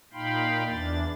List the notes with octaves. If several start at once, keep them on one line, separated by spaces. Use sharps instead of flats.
A#2 D#4 F5 G5 B5 C6
E2 E3 D4 A6